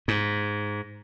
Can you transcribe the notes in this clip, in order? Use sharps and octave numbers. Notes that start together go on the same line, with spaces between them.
G#2